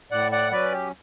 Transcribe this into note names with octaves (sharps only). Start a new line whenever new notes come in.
A2 D5 F#5
D5 F#5
F#3 C#4 B4 D5
G4